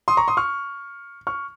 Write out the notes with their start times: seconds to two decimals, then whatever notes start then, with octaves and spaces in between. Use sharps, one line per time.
0.08 C6 D#6
0.17 A#5 C#6
0.28 C6 D#6
0.37 C#6 F6
1.27 C#6 F6